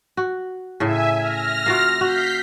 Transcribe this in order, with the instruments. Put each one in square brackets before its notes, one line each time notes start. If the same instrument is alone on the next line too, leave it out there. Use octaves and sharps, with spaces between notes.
[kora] F#4
[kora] A2 C#3 [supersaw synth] E5 G#5
[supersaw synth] F6 A#6
[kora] A#3 F4 F#4
[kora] F#4 [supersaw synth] G6 B6 C7